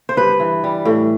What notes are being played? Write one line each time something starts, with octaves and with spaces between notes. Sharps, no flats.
C5
G2 B4
E3
G3
A2